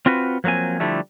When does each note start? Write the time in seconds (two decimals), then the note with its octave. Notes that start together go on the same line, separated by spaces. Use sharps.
0.06 C4 F4 F#4 B4
0.44 F3 F#3 A#3 C4 G#5
0.80 D3 F3 G3 A3 E4